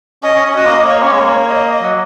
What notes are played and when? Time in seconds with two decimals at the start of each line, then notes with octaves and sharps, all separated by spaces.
0.23 C#4 D#5
0.35 C#4
0.45 C#4
0.55 F#4 D#5
0.66 A#3
0.76 A#3
0.87 A#3 C#5
1.02 C#4
1.12 G#3
1.19 A#3
1.50 D#5
1.82 F#3